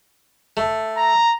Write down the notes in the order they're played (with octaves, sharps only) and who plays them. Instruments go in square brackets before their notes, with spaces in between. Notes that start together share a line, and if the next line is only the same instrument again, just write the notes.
[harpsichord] A3
[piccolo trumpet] A#5